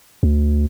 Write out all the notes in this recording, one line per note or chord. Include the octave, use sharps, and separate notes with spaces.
D2